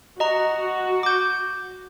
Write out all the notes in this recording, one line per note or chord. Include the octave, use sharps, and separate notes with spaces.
F#4 D#5 A#5
D6 G6